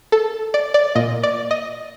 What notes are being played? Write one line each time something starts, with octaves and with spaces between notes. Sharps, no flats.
A4
D5
D5
A#2 D#5
D5
D#5